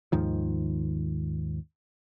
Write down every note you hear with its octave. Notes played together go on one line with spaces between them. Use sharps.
D#2 G#2 D#3 F3